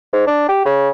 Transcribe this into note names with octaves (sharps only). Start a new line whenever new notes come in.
G#2
D4
G4
C#3